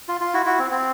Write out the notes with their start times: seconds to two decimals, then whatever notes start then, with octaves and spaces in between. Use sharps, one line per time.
0.08 F4
0.21 F4
0.34 E4 F#4
0.46 E4 F#4
0.59 C4
0.71 C4